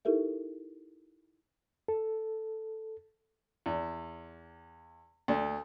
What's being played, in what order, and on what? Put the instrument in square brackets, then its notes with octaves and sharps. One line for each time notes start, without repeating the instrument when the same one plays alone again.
[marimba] D#4 E4 G4 A4 A#4 E5
[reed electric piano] A4
[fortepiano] E2
D2